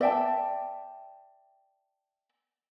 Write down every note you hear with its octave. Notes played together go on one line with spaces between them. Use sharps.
D5 E5 G5 A5